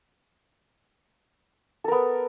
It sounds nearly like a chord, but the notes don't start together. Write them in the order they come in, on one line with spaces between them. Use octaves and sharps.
A4 A#4 B3